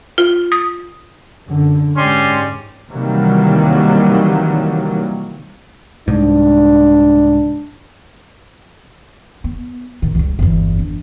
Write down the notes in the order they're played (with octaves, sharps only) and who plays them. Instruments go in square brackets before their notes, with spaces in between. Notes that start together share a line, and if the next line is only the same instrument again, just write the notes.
[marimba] F4
D#6
[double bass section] F#2 D3
[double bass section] G#2 [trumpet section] C#4 G4 D5 [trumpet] C6
[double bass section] C3 D#3 E3 F#3 G3 A#3
[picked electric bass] C2 G#2 [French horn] D4
[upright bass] B3
A1 D#3
C#2 G3
G1 E2
D4